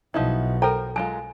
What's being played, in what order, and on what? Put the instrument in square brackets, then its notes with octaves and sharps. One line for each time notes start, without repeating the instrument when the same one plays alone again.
[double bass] B1 B2 [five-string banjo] F3 D#4 E4
[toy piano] A4 A#5 [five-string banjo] A#4 C5 G5
[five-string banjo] F#3 G#3 F4 [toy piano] G#5